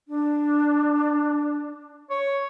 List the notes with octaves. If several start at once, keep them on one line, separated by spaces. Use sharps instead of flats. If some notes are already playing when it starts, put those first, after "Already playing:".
D4
C#5